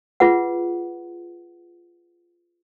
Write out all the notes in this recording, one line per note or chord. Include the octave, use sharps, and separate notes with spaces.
F4 G#4 B4 F#5